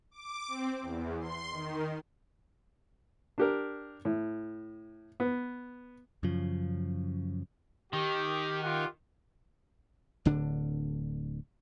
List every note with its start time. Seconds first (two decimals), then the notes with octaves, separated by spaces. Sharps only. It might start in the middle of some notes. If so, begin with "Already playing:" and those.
0.11 D6
0.48 C4
0.81 E2
1.20 C6
1.50 D#3
3.38 D4 G4 A#4
4.05 A2
5.20 B3
6.23 F#2 C#3 F3
7.93 D#3 G4
8.63 F4 G4 F#5
10.25 D1 D3 D4